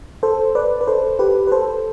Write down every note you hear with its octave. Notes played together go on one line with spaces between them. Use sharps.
A4 C5
B4 D5
B4
A4 C5
G4 B4
B4
A4 C5